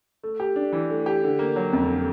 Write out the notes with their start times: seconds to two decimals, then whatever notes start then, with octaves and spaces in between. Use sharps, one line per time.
0.23 A3
0.40 G4
0.56 D4
0.72 E3
0.90 A3
1.06 G4
1.23 D3
1.39 A#3
1.56 F#3
1.73 F2
1.90 D3